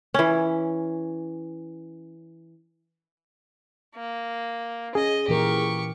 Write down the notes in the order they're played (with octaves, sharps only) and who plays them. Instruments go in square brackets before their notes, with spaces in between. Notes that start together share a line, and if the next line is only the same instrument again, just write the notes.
[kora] E3 C#4
[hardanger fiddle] A#3
[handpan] C#4 [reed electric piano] G#4 [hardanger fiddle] D#5
[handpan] A#2 E3 A#4 [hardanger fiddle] G4 C#6